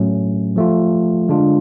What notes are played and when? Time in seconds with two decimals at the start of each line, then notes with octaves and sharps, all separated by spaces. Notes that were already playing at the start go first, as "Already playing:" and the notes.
Already playing: A2 F#3 A3 C#4
0.56 F3 A3 F4
1.29 D3 G#3 D4 F4